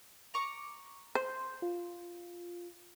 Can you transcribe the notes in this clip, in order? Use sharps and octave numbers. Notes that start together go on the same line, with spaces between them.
A#5 C#6 D6
C5 C6 G6
F4